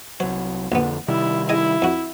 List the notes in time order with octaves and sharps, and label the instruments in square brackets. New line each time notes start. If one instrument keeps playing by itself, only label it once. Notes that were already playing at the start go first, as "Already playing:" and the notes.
[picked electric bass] C2 F#3 [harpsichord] C5
[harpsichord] A#1 B3 [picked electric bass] F2 D3
[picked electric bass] C3 D#3 G3 [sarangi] E4
[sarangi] E4 [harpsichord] G#4 D#5 G#5
[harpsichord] F2 F#4